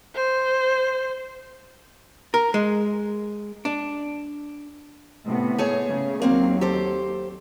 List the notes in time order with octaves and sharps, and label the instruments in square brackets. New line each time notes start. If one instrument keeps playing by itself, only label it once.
[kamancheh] C5
[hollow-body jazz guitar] A#4
G#3
D4
[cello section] A2 C3 B3
[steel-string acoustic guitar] A3 G#4 C#5
[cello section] C#3
[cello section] D#2 F#3 [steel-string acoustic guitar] A#3 C4 F5
[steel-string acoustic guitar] G4 A4 C5